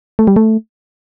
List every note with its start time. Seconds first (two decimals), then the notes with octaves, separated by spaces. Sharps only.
0.19 A3
0.27 G3
0.36 A3